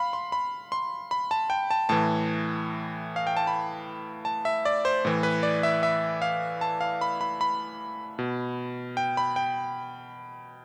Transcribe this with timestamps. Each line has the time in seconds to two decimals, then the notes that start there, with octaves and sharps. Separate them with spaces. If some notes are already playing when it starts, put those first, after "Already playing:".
Already playing: F5 B5
0.13 C6
0.32 B5
0.72 C6
1.11 B5
1.31 A5
1.50 G5
1.71 A5
1.89 A2 E3 A5
3.16 F5
3.27 G5
3.37 A5
3.47 B5
4.25 A5
4.45 E5
4.65 D5
4.85 C5
5.05 A2 E3
5.23 B4
5.43 D5
5.63 E5
5.83 E5
6.22 F5
6.61 A5
6.81 F5
7.01 B5
7.21 B5
7.41 B5
8.19 B2
8.97 G5
9.17 B5
9.36 G5